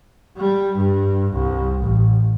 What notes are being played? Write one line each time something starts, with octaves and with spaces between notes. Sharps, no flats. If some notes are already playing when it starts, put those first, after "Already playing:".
G3
G2
C2
A1